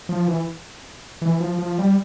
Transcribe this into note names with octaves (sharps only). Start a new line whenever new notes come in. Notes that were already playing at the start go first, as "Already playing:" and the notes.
F3
E3
E3
F3
F3
G3